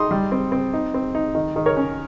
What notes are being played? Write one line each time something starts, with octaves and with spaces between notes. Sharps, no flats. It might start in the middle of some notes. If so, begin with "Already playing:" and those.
Already playing: D#4 C6 D#6
G3
C4
C4
D#4
C4
D#4
D#3
D#3
A#4 C#5
C#4